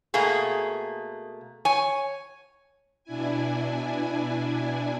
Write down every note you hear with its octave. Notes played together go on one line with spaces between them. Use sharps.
B2 A3 A#3 G#4
C#5 G#5
B2 D4 E4 G#5